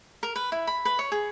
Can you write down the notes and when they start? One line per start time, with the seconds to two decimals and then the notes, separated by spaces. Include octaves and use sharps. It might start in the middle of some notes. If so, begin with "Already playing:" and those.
0.23 A#4
0.36 B4
0.52 E4
0.67 B5
0.85 B4
0.99 C#5
1.12 G#4